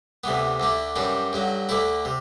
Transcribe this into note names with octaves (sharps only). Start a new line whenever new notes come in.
D2 C3 E3 B3
D2 D3 A3 D4
F#2 E3 G3 D4
G2 D3 F#3
D2 D3 A3 E4
C3